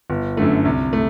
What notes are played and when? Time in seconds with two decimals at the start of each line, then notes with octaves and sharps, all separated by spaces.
0.10 G1
0.37 F#2 D3 A3
0.65 C2
0.93 A3